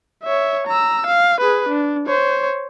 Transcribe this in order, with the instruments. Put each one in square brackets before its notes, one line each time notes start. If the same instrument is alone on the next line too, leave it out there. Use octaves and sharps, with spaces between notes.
[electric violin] C#5 E5
A#5 E6
F5
G#4 B4
D4
C5 C#5